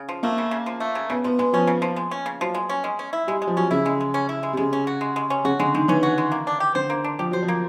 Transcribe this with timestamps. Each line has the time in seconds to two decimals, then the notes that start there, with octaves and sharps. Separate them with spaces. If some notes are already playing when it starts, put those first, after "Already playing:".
Already playing: C#3
0.09 F3
0.23 A3 A#3
0.38 C#3
0.51 C#3
0.66 F3
0.80 A3
0.95 C#3
1.10 C#3 B3
1.24 F3 B3
1.39 G#3 B3
1.53 F3 C#4
1.67 C#3
1.82 F3
1.96 G#3
2.11 C#4
2.26 C#3
2.41 F3 F#3
2.55 G#3
2.69 C#4
2.84 G#3
2.99 C#4
3.13 E4
3.27 G3 G#3
3.42 G#3
3.47 F3
3.56 F#3 C#4
3.71 C#3 E4
3.86 G#3
4.01 G#3
4.14 C#4
4.29 E4
4.43 G#3
4.53 C3
4.57 C#3 G#3
4.73 C#4
4.87 F#4
5.01 G#3
5.16 G#3
5.30 C#4
5.45 C#3 F#4
5.60 D3 G#3
5.75 D#3 G#3
5.88 E3 C#4
6.03 F#4
6.18 G#3
6.32 A#3
6.47 D4
6.60 G4
6.75 D3 C5
6.90 A#3
7.04 D4
7.19 F3 G4
7.31 F#3 C5
7.43 F3
7.48 A#3